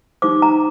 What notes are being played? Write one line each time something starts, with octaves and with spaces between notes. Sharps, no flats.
D#4 G4 C5 D6
A#5